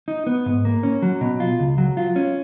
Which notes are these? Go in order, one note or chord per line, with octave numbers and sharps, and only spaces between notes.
D#4
B3
G#2
A#3
C#4
F#3
B2
F4
C#2
F#3
F4
C#4